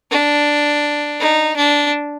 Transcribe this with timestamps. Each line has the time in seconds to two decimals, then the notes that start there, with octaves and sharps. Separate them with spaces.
0.11 D4
1.20 D#4
1.56 D4